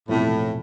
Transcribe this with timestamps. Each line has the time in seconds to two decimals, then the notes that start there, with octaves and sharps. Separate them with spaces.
0.08 E1 E2 A2 C3 F3